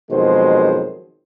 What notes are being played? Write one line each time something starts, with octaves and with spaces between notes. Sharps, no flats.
F2 B2 D#3 F#3 G#3 C5